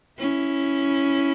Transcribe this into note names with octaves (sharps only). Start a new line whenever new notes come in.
C#4 E4